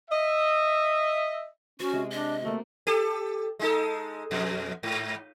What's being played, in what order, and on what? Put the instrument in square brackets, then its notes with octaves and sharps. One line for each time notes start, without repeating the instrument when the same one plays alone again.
[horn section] D#5 E5
[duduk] C#4 [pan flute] F#4 [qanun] C5
[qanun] C3 G#3
[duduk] D4 [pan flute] D#5
[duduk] A3 [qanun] A#3 C4 F#4
[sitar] G4 A4
G#3 D#4 A4
F2 B2
G#2